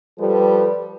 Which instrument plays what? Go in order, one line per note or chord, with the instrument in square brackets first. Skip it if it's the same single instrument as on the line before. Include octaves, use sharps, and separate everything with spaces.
[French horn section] F3 G3 A4 B4